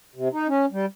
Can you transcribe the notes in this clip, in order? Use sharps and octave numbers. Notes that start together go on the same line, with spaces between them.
C3
D#4
C#4
G3